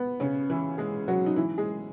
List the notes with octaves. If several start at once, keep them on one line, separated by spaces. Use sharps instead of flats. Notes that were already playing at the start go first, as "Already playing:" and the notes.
Already playing: B3
C#3 C#4
E3 E4
G#3 G#4
F#3 F#4
D#4
E3 E4
G#3 G#4